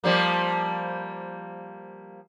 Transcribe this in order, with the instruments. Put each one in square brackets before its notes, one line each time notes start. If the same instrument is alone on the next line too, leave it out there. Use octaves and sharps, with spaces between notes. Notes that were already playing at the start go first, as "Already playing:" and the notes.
[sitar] F3 G3 A#3